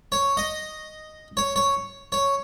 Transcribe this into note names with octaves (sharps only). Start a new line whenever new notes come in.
C#5
D#5
C#5
C#5
C#5